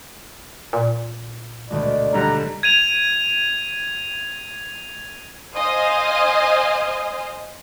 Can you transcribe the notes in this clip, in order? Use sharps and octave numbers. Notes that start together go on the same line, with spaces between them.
A#2
G#1 D2 B2 D5
D3 G3 A#5 F#6
G#6 D#7 F7
C5 D#5 F5 G#5